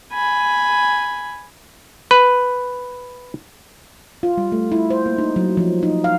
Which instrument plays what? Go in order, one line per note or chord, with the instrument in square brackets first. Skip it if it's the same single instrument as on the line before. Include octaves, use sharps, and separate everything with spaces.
[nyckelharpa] G#5 B5
[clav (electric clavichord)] B4
[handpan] F4
G3
A3
E4
C5
A#3
D#4
F#3
F3
D#4
F5